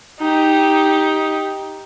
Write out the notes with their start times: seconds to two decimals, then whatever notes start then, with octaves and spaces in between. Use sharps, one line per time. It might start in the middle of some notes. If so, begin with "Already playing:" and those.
0.20 D#4 G4